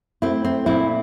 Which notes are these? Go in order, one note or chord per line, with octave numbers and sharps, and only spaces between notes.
A3 C4 E4
C4
A#2 C4 E4